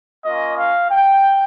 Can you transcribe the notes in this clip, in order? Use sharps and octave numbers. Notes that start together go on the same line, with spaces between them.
A#3 C#4 F4 D#5
F5
G5